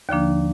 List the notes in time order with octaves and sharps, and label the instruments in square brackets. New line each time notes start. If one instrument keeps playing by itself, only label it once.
[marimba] D#2 D3 F3 A#3 D4